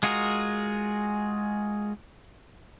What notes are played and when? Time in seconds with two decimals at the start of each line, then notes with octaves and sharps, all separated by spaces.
0.03 G#3 F4 F#4 G#4 A#4